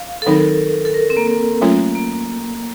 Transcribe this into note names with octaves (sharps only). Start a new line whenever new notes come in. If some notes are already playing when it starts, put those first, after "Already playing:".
Already playing: F5
A4
D#3 F#3 C4 D#4 A#4
A4
A#4
C4
A#3
A#3
F#3 A3 C#4 F4
A#3